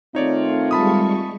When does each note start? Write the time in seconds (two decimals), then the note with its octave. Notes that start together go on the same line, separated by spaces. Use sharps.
0.15 D#3 A3 C4 D#4 F4 C#5 D5
0.71 G3 G#3 A5 B5 C#6 D#6